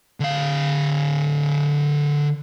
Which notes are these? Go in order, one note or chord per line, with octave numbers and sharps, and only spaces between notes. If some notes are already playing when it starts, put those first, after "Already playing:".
D3 F5